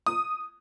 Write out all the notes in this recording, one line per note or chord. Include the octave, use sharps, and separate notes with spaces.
D#6